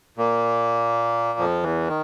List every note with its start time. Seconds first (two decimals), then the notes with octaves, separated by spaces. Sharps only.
0.17 A#2 A#3
1.39 F2 F3
1.63 E2 E3
1.88 D#3